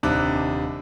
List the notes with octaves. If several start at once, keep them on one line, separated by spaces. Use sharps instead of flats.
D#1 C3 G3 D4 D#4 F#6